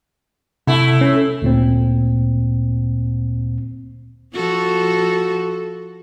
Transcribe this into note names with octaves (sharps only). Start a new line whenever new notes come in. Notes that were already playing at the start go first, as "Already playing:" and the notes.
C3 A3 E4
C#4
D2 A#2 C4
F3 F#4 A4